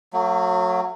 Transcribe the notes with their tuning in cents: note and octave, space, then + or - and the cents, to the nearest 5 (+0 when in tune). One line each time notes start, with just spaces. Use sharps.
F#3 -15 A3 +40